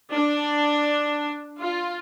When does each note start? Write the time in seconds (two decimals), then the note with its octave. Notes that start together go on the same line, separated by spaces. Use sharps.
0.13 D4
1.58 F4